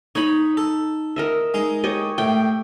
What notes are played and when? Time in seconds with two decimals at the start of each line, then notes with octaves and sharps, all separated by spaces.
0.15 D#4 C#5 D#5 B5
0.57 A4
1.16 A#4 D#5 E5
1.54 G#3 D#4
1.84 G4 C#5 D#5
2.18 A2 G5